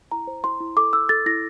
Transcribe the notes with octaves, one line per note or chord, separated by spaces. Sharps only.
E4 A#5
C5
E4 C6
E4
A4 D6
E4 E6
A4 A6
E4 A#6